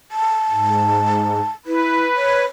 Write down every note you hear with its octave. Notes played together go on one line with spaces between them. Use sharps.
A5
G#2
E4 B4
C#5